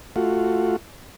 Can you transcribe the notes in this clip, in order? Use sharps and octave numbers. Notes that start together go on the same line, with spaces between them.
A3 F4 F#4